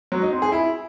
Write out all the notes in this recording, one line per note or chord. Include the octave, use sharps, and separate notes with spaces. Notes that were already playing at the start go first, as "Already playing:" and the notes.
F#3
D#4
C4
G#4
E4